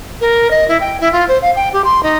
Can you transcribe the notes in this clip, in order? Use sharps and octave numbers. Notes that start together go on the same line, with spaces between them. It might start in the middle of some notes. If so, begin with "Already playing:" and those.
A#4
D#5
E4
G5
E4
F4
C5
F5
G5
G4
C6
D#4